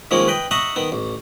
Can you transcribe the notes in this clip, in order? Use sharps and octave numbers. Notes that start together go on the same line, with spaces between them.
D#3 F3 G#3 A#3 C#4
B4 D#5 G5
D#5 E5 F#5 A#5 C#6 D#6
D#3 B3
A1